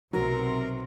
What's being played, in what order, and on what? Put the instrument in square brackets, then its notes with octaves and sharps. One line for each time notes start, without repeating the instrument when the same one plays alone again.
[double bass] B1 [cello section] C3 C4 [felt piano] F#3 [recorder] A#4